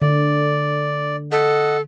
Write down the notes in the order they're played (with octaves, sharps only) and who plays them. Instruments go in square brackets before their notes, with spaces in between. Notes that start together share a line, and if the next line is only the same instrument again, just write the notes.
[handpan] D3 [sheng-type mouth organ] D5
[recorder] A4 [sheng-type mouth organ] D#5 F#5